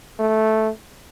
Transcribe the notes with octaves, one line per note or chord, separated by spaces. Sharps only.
A3